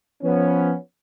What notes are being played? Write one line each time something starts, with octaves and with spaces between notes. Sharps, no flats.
F3 B3 C#4